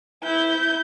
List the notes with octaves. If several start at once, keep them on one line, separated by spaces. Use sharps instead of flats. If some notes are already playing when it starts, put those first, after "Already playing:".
E4 G6